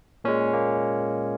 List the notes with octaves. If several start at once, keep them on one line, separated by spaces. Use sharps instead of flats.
A#2 G#3 C#4
A#3